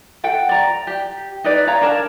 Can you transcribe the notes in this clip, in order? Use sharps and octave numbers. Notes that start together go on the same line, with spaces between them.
A4 F#5 G5
D5 A#5
G4
D#4 B4 D5
C#5 F5 A#5
D4 A#4 C#5 A5